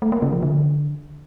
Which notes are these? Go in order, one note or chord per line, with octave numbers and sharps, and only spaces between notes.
A3
A#3
C#3
F3
D3